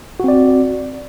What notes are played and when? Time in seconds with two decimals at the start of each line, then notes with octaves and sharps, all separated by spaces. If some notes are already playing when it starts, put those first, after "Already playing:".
0.20 F#4
0.24 C4
0.28 D5